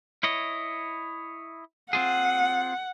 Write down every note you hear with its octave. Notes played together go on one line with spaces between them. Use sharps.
E4 C#5 D#5
C4 F4 G#4 F#5